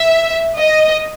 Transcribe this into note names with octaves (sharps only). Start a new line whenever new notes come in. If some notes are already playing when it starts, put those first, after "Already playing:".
Already playing: E5
D#5